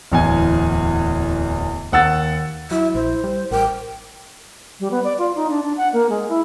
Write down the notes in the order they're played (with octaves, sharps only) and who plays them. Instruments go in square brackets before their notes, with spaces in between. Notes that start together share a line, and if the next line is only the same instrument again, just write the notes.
[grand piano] D1 E2 G#5
D#2 F#5 E6 A6
[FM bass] F#3 [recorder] E4 [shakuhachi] E5
[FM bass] A#1 [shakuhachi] C5
[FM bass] G3
[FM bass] A1 [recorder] A#4 [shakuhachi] G5
[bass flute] G3
B3
D5
F4
D#4
D4
D4
F#5
A#3
G#3
E4